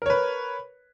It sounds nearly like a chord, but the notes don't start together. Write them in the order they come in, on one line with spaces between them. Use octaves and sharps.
A#4 C#5 B4